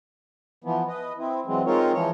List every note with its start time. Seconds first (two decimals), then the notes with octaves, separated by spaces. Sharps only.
0.64 E3 F3 B3
0.87 B4 D#5
1.18 C4 E4
1.46 E3 F#3 G#3 C4
1.66 G#3 C4 D#4 F4 A#4 C#5
1.93 E3 F3 C#5